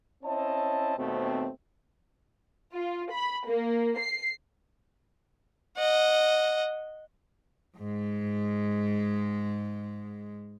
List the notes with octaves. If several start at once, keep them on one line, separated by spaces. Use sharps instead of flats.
C4 C#4 E4 C#5 D#5 A5
D#2 B2 A3 B3 C4
F4
B5
A#3
C7
D#5 F#5
G#2 G#3